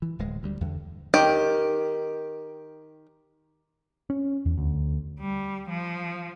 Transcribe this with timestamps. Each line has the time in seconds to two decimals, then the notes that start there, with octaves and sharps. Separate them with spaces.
0.02 E3
0.19 D1 G#3
0.43 D2 G3
0.61 E2 D3
1.14 D#3 G4
4.10 C#4
4.46 E2
4.58 D2
5.20 G3
5.70 F3